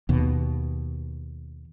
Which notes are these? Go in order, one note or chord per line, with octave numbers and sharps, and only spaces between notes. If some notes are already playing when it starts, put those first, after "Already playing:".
D#2 B2